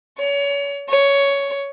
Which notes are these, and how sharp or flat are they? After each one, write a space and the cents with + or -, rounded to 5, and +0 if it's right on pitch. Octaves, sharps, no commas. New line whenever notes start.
C#5 +30
C#5 +10